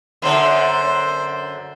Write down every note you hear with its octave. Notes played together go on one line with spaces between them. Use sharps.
F#2 D3 C5